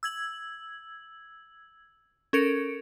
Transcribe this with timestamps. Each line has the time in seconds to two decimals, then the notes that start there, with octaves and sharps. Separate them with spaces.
0.03 E6 G#6 F#7
2.33 C#4 A4 A#4 C#7 D7